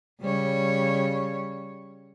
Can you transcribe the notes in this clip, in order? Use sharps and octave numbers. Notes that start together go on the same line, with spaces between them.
C#3 G3 C#5